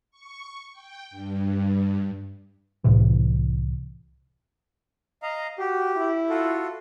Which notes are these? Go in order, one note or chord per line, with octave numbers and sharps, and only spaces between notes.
C#6
G5
G2
C2 A2 C3 E3
D#5 F5 A#5
F#4 G4
E4
F4 F#4 A4